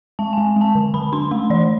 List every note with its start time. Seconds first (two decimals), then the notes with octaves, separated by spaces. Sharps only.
0.19 G#3 A5
0.33 G#3 G#5
0.56 G#3 A5
0.75 D3
0.94 D3 B5
1.13 D4 C6
1.31 A3 C6
1.50 E3 D5